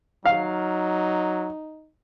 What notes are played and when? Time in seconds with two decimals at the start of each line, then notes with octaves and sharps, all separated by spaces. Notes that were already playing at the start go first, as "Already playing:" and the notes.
0.25 F#3 D#4 F5